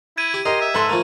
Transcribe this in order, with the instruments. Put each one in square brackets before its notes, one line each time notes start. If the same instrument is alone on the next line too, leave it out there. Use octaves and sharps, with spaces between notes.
[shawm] E4 [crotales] G#6 D#7
[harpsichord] G4
[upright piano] G4 D#5 [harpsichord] A#4 [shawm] C6
[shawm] E5
[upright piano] G#2 A4 C6 [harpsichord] B4
[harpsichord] F3 A3 A#3